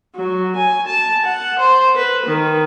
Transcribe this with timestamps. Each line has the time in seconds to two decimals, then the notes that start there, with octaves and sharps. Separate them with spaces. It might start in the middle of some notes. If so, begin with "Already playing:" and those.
0.16 F#3
0.56 G#5
0.86 A5
1.25 F#5
1.59 C5
1.95 B4
2.26 D#3